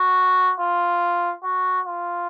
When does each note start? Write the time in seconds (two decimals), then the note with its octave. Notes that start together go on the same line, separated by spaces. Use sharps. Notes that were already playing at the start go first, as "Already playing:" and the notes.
Already playing: F#4
0.60 F4
1.43 F#4
1.85 F4